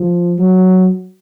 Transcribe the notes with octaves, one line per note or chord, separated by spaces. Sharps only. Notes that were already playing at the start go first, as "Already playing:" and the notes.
Already playing: F3
F#3